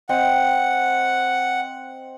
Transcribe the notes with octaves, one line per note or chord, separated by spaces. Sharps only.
C4 D#5 F#5 G5